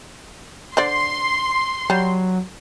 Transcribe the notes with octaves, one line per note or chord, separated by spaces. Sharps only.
D3 C5 D5 C6
F#3 G3